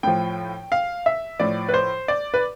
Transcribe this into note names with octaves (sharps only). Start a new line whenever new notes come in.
A2 F3 G5
F5
E5
A2 F3 D5
B4
C5
D5
B4